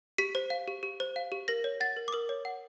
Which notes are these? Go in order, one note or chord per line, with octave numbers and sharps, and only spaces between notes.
G4 B6
C5
F5
G4
G4
C5
F5
G4
A#4 A#6
C#5
F#5 A6
A#4
D6
A#4 D#6
C#5
F#5